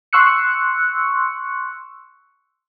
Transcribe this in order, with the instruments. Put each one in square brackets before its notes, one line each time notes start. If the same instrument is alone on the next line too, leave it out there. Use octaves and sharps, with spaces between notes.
[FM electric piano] C6 C#6 E6 F#6 C#7